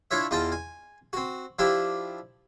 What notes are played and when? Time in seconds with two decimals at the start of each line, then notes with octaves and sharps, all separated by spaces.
0.11 D4 E4 F4 C#5 E5
0.31 E2 F4 D#5 G5 A5
0.52 G#5
1.13 C4 F#4
1.59 F3 D4 E4 G4